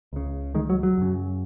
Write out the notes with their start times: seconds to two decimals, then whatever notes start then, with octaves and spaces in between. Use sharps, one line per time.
0.13 C#2 C#3
0.55 D#3 G#3
0.70 F#3
0.83 F#3
0.98 F#2 C#3